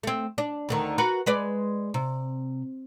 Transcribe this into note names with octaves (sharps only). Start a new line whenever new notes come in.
A3 C4
D4
D2 D3 D#3
F#4 A#4 B4
G#3 B4 D5
C3